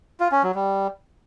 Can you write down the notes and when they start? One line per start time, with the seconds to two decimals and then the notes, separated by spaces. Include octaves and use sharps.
0.20 F4
0.32 C#4
0.43 F#3
0.55 G3